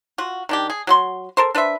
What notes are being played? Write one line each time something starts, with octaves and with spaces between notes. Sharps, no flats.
F4 F#4
D#3 D4 G4
G#4
F#3 F#4 C6
A4 A#4 C5
D4 B4 C5 E5